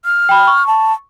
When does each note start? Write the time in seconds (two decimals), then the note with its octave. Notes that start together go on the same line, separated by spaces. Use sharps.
0.05 F6
0.29 G5 B5
0.47 C#6
0.67 A5